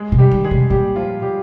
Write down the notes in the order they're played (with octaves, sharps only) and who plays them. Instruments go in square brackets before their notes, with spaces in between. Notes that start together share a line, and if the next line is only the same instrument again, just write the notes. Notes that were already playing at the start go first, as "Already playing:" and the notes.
Already playing: [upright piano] G#3 G#4
[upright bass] C3
[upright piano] G3 G4
[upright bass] D#3
[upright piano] G#3 G#4
[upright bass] C3
[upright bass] A#2 [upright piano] G3 G4
[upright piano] F3 F4
G3 G4